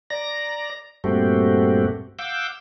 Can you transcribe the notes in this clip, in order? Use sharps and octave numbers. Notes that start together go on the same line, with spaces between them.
D5 A#5 A#6
G2 A#2 A3 C4 F#4 G4
F5 F#5 D6 E6 G6